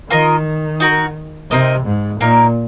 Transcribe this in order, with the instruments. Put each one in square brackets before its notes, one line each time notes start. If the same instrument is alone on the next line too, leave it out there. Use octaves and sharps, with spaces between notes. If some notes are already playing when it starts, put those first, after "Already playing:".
[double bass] D#3 [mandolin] F4 A#4 D#5
[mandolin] D#4 F#4 A#4
[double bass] C3 [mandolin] C4 D#4 A#4 D#5
[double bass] G#2
[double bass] A#2 [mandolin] A#3 D#4 A#4